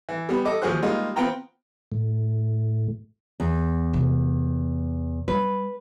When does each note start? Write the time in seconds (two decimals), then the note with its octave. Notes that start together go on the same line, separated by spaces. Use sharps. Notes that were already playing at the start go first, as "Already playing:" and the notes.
0.09 E3
0.29 G3 B3
0.45 A4 D#5 D6
0.62 D#2 F3 F#4 G#4 C5 F#6
0.82 G3 G#3 A#3 D#4 F4
1.16 B3 C4 F4 G5 A#5
1.92 A2
3.40 E2
3.93 C3 F4
5.28 G3 B4